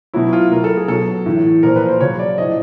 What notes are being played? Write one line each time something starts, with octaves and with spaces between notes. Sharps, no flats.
B2 F#3 E4
F4
B2 F#3 A#4
A4
G#4
B2 F#3 A4
A2 E3
A#2 F3 A#4
B4
C5
C#3 F#3 C#5
D5
A2 F3 D#5